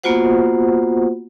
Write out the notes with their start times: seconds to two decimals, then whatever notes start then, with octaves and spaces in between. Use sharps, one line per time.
0.04 A#3 B3 F4 F#4 C5 F#5